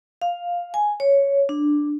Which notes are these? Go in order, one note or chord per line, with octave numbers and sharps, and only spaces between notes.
F5
G#5
C#5
D4